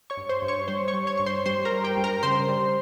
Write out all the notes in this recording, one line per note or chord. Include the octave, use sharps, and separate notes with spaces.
C#5 C#6
G2
C5 C6
G2
C#5 C#6
G3 C5 C6
C#5 C#6
G3
C#5 C#6
G2 C#6
C5 C6
G3 C5 C6
A#4 A#5
G3
G4 G5
G2
A#4 A#5
C#3 C5 C6
G3